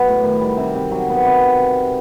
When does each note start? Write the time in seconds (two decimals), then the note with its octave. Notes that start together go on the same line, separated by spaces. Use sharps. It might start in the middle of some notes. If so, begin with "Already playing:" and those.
Already playing: F#3 B3
0.08 A2
0.24 D#3
0.41 G3
0.57 C3
0.75 C3
0.91 F#3
1.09 B3
1.25 C3